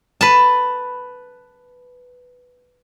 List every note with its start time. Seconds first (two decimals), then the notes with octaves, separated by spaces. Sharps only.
0.21 B4 A5